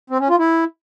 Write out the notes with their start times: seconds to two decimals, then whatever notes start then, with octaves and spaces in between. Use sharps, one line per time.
0.10 C4
0.20 C#4
0.29 F4
0.39 E4